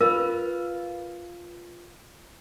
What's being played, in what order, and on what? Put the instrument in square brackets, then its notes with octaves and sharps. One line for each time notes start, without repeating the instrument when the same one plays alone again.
[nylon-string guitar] F4 B4 [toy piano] A#4